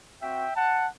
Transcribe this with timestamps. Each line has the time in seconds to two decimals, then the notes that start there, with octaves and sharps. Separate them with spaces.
0.21 C4 F#4 E5 G5
0.56 F#5 A5